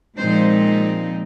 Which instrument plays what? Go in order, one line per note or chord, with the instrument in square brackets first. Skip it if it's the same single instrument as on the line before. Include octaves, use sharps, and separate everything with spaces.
[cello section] A#2 F3 G#3 C4 D#4 C5